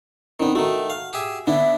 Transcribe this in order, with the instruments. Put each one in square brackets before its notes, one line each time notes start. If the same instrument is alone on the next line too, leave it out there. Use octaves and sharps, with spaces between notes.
[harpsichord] D#3 B3 [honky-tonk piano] C4 D4 D#4
[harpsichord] D#3 A3 [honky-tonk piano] F#4
[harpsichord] F5
G4 G#4 E5
[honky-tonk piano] D3 [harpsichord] B3 D4 [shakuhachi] E5